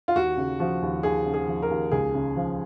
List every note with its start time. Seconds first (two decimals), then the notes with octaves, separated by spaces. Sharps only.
0.08 F4
0.16 D#2 F#4
0.37 C#3
0.60 F3 F#4
0.82 D#2
1.03 D#2 G#4
1.26 C#3
1.34 G#4
1.48 F3
1.63 A#4
1.70 D#2
1.91 C#2 G#4
2.14 C#3
2.36 F3